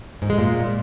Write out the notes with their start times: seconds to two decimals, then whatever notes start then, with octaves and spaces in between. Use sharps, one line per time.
0.22 G#2
0.30 G#3
0.38 A#2